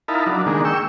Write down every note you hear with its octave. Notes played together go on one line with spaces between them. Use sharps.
D#4 E4 A#4 F5 A5 B5
F#3 D4
D#3 G#3 A#3 D4
G5 C#6 E6